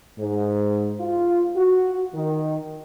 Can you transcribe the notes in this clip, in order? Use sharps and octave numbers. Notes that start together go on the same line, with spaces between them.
G#2
F4
F#4
D#3